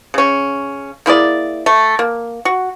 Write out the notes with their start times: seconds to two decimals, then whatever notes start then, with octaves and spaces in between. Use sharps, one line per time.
0.14 C#3 C#4
1.06 A#3 E4 G#4 D5
1.66 A3
1.99 A#3
2.45 F#4